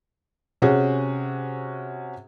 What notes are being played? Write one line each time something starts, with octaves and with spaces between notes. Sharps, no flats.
C3 C#4 F#4 G#4